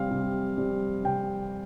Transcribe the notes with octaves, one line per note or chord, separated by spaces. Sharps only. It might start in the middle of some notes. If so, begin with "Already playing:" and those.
Already playing: C3 G3 C4 F5
C3
G3 C4
C3 G5